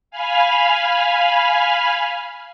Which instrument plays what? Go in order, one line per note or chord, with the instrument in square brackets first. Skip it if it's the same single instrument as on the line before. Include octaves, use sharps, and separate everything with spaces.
[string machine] F5 G#5 B5 F6